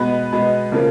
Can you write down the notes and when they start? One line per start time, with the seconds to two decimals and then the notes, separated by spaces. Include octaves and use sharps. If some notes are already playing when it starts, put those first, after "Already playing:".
Already playing: B2 G#3 B3 B4
0.32 B2 G#3 B3
0.72 C#3 F3 A#3